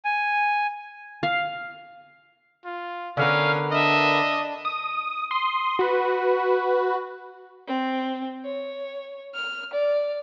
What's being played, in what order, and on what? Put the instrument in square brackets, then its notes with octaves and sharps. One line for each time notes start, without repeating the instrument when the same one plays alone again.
[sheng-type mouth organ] G#5
[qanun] F5
[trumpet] F4
[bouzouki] D3 B3 A#4 [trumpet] C#4 [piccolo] F5
[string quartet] D4 [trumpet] D#5 [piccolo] E5
[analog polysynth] D#6
C6 D#6
F#4 B4
[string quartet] C4
C#5
F6
D5